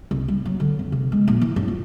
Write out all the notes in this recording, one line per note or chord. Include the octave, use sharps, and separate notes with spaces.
C2
G3
F#3
D3
F2
C3
G#3
A#1
E3
F#2
F4